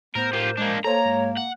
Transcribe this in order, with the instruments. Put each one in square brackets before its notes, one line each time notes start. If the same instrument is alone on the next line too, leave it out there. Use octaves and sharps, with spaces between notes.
[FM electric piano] A2 [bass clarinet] B3 [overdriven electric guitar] A#4 [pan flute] C5
[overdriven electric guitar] F4 G4 [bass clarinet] A#4
[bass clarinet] G#3 [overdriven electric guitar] A#3 D4
[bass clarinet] A#3 [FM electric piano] A4 C5 [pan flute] C#5 [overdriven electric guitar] A#5
[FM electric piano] G#2 G#3
[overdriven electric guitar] F#5